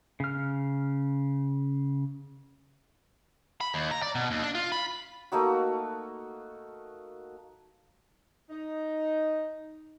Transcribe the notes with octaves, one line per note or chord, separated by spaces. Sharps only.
C#3 F6
B5
D#2
A#5
D5
B2
D#2
D4
F4
B5
A3 A#3 D#4 F#4
D#4